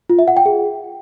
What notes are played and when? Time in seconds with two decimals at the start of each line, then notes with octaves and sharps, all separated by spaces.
0.10 F4
0.19 E5
0.28 F#5
0.37 G5
0.46 G#4